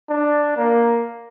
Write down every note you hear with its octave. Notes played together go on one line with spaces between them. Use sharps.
D4
A#3